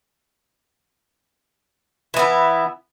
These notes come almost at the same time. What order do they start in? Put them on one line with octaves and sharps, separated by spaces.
E3 B3 E4